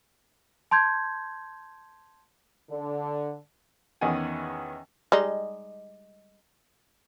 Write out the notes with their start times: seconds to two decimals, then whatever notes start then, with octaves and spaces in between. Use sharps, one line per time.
0.71 A5 C6 G6 G#6
2.70 D3
4.01 E2 D#3 B3 C#4 F#5 G#5
5.12 G3 G#3 D#4